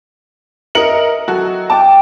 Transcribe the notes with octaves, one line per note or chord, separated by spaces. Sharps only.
A#4 D#5 E5 C#7 F#7
F#3 F#4 A4
G5 A5 D6